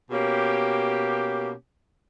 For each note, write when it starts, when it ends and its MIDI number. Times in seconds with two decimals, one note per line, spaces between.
0.11 1.52 47
0.11 1.52 58
0.11 1.52 61
0.11 1.52 67